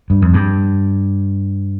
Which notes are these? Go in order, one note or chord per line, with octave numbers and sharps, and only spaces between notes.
G2
F2
G2